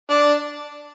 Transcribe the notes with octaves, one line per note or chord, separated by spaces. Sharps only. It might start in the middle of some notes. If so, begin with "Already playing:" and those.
D4 D5